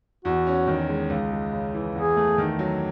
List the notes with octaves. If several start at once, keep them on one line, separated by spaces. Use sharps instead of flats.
E2 F#4
C#4
D#3
G#3
C#2
G#3
C#3
E3
E2 G#4
A3
D#3
F#3